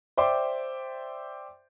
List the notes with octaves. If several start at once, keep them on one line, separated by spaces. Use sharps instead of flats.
C5 D5 E5 G5 C6 D6